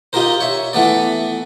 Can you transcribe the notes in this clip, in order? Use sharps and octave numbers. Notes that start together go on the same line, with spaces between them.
D#4 F4 G4 A#4 C5
C#5 E5
E3 A3 B3 D5